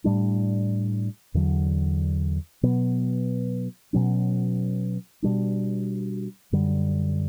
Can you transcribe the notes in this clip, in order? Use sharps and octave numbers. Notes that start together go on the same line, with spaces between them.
A2 G3 D4
E2 D3 F#3
B2 F#3 B3
B2 F#3 C#4
B2 G3 D4
F#2 D3 G3